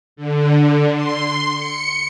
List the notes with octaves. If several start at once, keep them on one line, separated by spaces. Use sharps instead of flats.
D3
C6
C#7